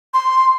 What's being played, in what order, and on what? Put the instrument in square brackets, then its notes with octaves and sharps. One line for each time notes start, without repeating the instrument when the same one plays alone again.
[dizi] C6